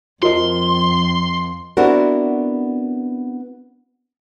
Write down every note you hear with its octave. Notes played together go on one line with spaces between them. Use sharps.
F2 F3 A#4 D#5 C6
B3 C4 D4 E4 F#4 A#4